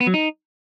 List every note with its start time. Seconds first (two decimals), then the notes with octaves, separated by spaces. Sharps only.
0.01 B3
0.07 F#3
0.14 D#4